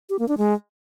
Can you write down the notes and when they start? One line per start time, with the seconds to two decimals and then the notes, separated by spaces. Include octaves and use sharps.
0.09 G4
0.19 A#3
0.28 D4
0.38 G#3